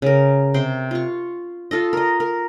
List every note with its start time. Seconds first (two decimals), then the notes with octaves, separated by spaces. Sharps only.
0.02 C#3 A#4
0.54 C3 C5 G5
0.91 F4 C#6
1.71 F4 A4 D#5
1.93 A#4 D#5
2.20 A#4